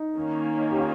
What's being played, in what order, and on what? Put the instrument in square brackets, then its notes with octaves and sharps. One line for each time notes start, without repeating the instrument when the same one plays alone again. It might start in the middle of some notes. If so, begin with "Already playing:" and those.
Already playing: [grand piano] D#4
[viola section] D#3 A#3 C#4
[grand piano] G4
F4